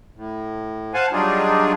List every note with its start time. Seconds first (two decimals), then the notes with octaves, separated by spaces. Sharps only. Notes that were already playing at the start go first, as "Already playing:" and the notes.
0.16 A2
0.94 C5 F5 F#5 G#5 A5
1.12 F#3 G3 D4 D#4 F4 G#4